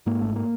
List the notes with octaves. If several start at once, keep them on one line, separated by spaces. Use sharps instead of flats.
G#2 A#3
G#1 A3
A#3